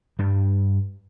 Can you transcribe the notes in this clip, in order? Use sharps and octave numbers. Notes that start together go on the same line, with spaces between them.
G2 G3